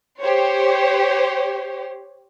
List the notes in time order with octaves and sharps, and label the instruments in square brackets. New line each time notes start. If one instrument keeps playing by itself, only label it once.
[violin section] G4 C5 C#5